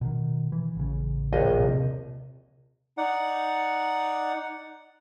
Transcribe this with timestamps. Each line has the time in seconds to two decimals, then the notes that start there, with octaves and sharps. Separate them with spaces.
0.01 B2 D3 D#3
0.52 E3
0.75 A1 C#3
1.33 A#1 D#2 D#5
1.58 C3
2.98 D#4 D5 F#5